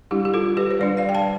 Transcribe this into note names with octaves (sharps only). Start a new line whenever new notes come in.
G3 D4 E4 G4
G4
F4 A4
G4 B4
C5
G3 D4 B4 D5
D5 F5
G5
F5 A5